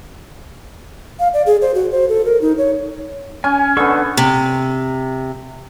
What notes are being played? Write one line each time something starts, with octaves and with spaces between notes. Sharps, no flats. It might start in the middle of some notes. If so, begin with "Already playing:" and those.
F5
D5
G#4
C5
F#4
C5
A4
A#4
D#4
C#5
C#4 G#5
D3 B3 A4 C#6 E6
C3